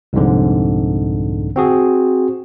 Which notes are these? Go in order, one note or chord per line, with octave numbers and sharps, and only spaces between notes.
C2 F2 G#2 D3
C4 F#4 G#4